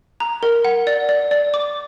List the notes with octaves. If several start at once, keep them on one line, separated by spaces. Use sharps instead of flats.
A#5
A#4
F#5
D5
D5
D5
D6